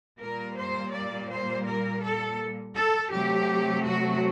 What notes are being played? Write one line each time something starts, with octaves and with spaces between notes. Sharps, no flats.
A#2 G3 A#3 A#4
C5
D5
C5
A#4
A4
A4
C3 F#3 A3 G4
F#4